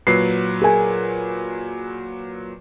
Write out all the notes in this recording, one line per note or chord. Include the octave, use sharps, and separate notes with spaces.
A#2 F#3 B4 C7
G#4 A#4 G#5